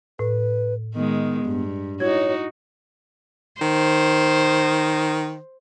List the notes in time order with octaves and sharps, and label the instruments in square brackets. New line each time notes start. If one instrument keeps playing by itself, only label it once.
[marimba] A2 [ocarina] B4
[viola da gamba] D#3 G#3 [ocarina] B3
[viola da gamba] G2
[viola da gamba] D#4 F#4 [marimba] E4 G#6 [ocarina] C#5
[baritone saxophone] D#3 [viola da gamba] C5